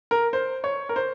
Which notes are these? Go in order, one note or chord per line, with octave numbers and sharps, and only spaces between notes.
A#4
C5
C#5
A#4
C5